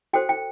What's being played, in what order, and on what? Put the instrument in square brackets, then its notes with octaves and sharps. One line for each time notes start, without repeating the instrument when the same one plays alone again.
[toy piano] F#4 A4 C5 G5
G5